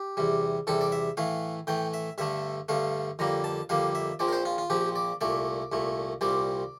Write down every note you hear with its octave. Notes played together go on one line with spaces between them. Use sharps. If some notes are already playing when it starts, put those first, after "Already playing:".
Already playing: G4
E2 C3 G3
E2 C3 G3 A4
D5
E5
A2 E3 A3 F5
A2 E3 A3 G5
E5
G2 D3 A3 E5
G2 D3 A3 F5
F2 D3 G3 A#3 A#5
A5
F2 D3 G3 A#3 F5
E5
A#1 A#2 F3 C4 D5
A#4
C5
F4
F4
A#1 A#2 F3 C4 G4
D5
C2 A#2 A3 D5
C2 A#2 A3
C2 A#2 G3 C4 D5